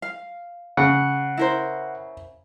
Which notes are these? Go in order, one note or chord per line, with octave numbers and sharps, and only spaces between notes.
F5
C#3 F#5
E4 A#4 C5